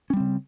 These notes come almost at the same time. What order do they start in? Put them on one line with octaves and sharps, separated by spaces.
C#4 G3 C4 C#3